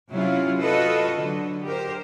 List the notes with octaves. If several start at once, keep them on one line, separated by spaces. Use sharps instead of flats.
C3 F#3 C#4 E4 F4
F4 F#4 A4 B4 D#5
D3 F#3
G4 A#4 C5